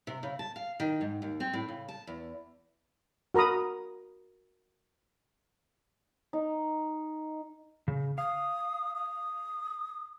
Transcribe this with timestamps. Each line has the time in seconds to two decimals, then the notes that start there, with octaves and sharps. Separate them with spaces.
0.07 C3
0.23 C#3
0.39 A5
0.56 F5
0.80 D#3
1.01 G#2
1.22 D#2
1.40 C4
1.53 A2
1.68 C#3
1.88 A5
2.07 E2
3.34 F#4 A#4 A#5 B5 D#6
6.33 D#4
7.88 C#3
8.18 F5 D#6
8.96 D#6